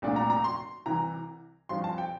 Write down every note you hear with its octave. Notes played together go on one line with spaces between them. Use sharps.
C2 A#2 A3 D4
A#5
A#5
C6
C2 C3 E3 A#5
G2 F3 C4 C6
A5
G5